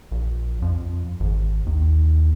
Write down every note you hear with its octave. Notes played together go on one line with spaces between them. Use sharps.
A#1
F2
G#1
D#2